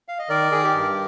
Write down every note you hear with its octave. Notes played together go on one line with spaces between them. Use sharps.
F5
D#5
D#3 A#4 D5
D#3 G#4
G4 A#4
G2